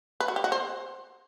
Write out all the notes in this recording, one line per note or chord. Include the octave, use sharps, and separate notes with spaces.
B4
F#4
G4
F#4
C5